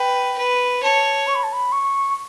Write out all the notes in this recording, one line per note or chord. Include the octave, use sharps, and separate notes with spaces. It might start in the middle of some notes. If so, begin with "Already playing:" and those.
Already playing: B4 G5
B4
C#5 A5
C#6
B5
A5
B5
C#6